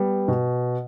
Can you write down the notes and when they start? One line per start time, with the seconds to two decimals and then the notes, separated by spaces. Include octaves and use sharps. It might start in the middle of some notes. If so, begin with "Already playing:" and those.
Already playing: G3 B3
0.28 B2